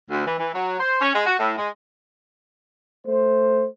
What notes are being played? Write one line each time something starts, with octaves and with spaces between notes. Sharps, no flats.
D2
E3
E3
F#3
C5
C#4
G#3
F#4
A2
G#3
A3 C5